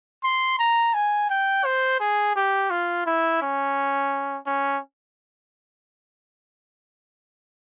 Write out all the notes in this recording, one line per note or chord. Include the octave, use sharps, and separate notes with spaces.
C6
A#5
G#5
G5
C5
G#4
G4
F4
E4
C#4
C#4